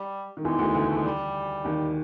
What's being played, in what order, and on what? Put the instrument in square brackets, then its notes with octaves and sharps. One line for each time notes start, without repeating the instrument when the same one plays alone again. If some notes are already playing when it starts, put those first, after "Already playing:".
Already playing: [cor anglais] G3
[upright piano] D#3
[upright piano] E2 E3 [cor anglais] G#3
[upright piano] D2 D3
D2 D3
[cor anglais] A3
G#3
G3
[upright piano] D#2 D#3